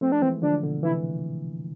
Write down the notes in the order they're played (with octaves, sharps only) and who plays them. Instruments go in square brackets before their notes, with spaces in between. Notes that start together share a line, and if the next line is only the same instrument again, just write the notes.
[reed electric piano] F3 A3 [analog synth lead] C4
[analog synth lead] D4
[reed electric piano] E3 G#3 [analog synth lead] C4
[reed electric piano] D3 F3 [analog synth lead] D4
[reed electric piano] B2 D3
[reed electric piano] C3 E3 [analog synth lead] E4